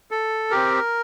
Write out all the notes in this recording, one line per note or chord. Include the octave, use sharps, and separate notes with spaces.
A4
C4 G4 A#4